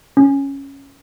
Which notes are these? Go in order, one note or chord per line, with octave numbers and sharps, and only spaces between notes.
C#4